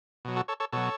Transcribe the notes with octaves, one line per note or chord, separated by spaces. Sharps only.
B2 F#3
F#4 A4
A4 C#5
A4 C#5
B2 F#3 A4 C#5